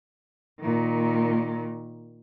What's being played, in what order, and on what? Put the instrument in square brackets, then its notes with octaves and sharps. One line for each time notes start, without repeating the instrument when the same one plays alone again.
[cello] A#2 D#3